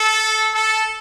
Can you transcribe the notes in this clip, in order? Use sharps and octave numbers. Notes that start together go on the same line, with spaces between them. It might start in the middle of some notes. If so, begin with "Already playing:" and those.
Already playing: A4
A4